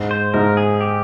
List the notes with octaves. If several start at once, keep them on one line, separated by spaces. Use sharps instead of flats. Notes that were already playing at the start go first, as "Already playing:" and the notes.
Already playing: G#2
C5
G#2 A#4
G#4
G4